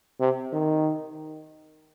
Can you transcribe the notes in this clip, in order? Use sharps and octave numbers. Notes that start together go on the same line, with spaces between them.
C3
D#3